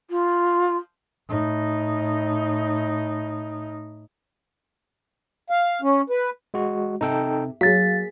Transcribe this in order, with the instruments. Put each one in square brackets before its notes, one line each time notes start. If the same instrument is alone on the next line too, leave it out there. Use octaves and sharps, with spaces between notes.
[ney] F4
[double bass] A2 D#4
[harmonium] F5
C#4
B4
[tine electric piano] G#3 F#4
[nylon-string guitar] C3 [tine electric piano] D#4 A4 G5
[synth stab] F#3 [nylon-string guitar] A#3 G#4 [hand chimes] F5 A6 [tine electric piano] B6